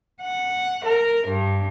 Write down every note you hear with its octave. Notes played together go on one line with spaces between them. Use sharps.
F#5
A#4
G2